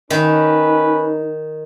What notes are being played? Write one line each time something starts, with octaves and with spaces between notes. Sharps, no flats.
D#3 C#4 D#4 B4